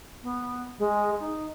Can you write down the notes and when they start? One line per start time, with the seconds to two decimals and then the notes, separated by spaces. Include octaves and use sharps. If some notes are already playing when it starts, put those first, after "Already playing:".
0.23 B3
0.78 G#3
1.19 D#4